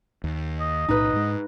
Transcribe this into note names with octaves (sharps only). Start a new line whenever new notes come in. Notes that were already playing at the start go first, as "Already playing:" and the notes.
D#2
D#5
B1 A2 D#4 B4
G#2 G#3